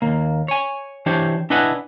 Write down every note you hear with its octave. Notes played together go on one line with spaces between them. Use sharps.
D#2 A#3
C#5 G#5
E3 D4 G4 C5 C#5
D4 E4 B4 D#5 F#5 G#5